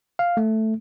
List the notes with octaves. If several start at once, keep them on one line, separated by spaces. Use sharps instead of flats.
F5
A3